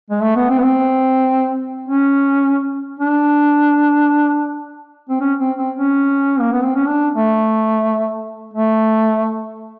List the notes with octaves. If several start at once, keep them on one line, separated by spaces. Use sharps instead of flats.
G#3
A3
B3
C4
B3
C4
C#4
D4
C4
C#4
C4
C4
C#4
A#3
B3
C4
C#4
D4
A3
A3